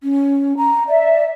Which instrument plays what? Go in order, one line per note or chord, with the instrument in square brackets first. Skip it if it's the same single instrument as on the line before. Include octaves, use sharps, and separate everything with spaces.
[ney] C#4
A#5
[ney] D5 [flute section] E5